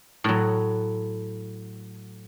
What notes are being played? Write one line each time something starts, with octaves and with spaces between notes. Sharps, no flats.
A2 F#3